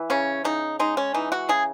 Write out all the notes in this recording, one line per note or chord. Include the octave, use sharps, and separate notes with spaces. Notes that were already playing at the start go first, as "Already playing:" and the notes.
Already playing: E3
C#3 C#4
C#3 D#4
G#3 D#4
C#4
E3 D#4
F#4
C#3 G#4